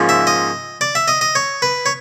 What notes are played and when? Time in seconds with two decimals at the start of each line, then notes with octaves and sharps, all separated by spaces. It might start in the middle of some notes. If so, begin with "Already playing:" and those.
Already playing: G#2 F3 A#3 C#4
0.09 E5
0.27 D#5
0.81 D5
0.95 E5
1.08 D#5
1.21 D#5
1.35 C#5
1.62 B4
1.86 C#5